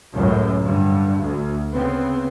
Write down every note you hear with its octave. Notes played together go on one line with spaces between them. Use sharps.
C#2 F#2 A2
G2 D3
D2
C#3 B3 C4